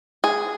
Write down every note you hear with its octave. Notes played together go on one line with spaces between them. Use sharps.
G#4